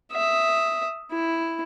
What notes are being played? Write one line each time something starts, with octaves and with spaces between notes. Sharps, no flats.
E5 D#6
E4